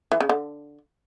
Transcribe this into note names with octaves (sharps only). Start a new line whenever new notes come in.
E3
C#3
D3